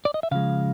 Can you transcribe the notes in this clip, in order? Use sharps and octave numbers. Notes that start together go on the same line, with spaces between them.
D5
D#5
E5
C#3 F3 G#3 F5